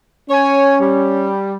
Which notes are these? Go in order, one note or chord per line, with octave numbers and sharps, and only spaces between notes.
C#4 C#5 G#5
G3